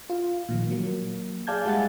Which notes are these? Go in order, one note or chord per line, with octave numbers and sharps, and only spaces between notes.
F4
A#2 D#3 F3
F#3 A#3
G#4 D5 F5 A5 G6 G#6
G3 G#3 E4 F#5 G#5 A6